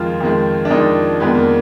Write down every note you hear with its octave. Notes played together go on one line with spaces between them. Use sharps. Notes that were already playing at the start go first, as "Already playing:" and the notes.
Already playing: F2 D#3 F3 G#3 F4
F2 D#3 G#3
D4
F2 D#3 G#3 D#4
F2 D#3 G#3 B3
A#3